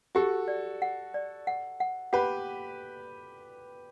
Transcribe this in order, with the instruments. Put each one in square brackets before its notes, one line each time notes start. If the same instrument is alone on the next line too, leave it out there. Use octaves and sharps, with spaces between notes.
[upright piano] F#4 A4 [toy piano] G4
[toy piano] D5
F#5
D5
F#5
F#5
[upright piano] G4 B4 [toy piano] F#5